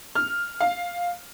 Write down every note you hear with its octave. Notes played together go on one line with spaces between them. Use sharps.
F6
F5